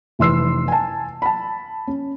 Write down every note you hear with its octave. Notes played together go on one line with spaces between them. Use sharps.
F1 E3 C6 E6 C7
G#5 A5
A5 B5
C#4